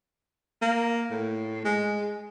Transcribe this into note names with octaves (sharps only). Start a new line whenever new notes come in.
A#3
A2
G#3